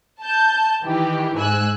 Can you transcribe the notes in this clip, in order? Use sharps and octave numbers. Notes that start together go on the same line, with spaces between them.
A5 G6
D#3 E3 G4
G#2 G#5 E6 F#6